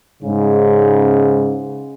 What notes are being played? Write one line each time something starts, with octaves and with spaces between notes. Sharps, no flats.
G#2 C#3